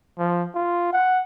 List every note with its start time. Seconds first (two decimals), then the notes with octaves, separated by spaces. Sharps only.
0.18 F3
0.55 F4
0.93 F#5